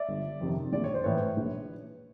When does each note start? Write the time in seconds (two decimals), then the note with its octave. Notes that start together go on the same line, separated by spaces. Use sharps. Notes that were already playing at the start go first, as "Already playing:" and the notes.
Already playing: D5 E5
0.09 G1
0.40 F2 C3 D#3
0.73 A#1 D5
0.84 C#5
0.94 C5
1.04 A2 E3 B4 C#5
1.37 A#1